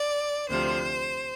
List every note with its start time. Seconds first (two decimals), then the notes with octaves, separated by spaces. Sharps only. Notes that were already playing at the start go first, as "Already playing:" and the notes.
Already playing: D5
0.48 D2 C3 F3 C5